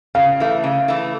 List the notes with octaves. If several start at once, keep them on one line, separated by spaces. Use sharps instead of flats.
C#3 F5
E3 A3
C#3
E3 A3